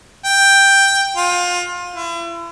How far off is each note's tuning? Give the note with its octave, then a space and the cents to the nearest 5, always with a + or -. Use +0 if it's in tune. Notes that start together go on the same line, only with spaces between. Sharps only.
G5 +5
F4 +25
E4 +40